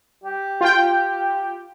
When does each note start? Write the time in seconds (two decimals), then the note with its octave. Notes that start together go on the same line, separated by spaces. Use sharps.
0.24 G4
0.61 F4 G5